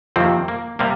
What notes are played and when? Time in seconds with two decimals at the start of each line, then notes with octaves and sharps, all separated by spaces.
0.16 F2 C3 D#3 A#3 C4
0.48 A#3
0.79 C3 G3 A#3